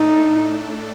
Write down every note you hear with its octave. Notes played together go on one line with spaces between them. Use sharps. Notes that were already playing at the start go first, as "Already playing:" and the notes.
Already playing: A2 A3 D4 D#4 A4